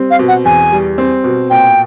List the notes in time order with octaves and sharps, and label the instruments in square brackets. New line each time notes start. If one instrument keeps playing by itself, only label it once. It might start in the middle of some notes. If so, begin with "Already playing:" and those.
Already playing: [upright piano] G3 C4
[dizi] F5
[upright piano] B2
[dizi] F#5
[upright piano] E2 [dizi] G#5
[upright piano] G3
C4
B2
[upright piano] A#2 [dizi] G5